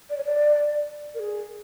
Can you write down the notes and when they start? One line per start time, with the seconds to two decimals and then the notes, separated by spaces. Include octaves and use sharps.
0.10 D5
0.18 C#5
0.25 D5
1.15 A#4
1.19 G#4